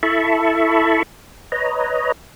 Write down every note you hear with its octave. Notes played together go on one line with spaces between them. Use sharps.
E4 A4 E5 A5 B5 C#6
B4 C#5 D#5 A#5